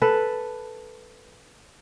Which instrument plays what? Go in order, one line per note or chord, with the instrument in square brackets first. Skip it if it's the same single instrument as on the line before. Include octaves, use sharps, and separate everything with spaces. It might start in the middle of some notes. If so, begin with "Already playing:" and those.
[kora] A4 B4